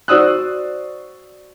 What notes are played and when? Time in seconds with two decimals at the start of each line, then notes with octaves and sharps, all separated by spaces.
0.08 F#4 C5 D5 D#6 E6 F#6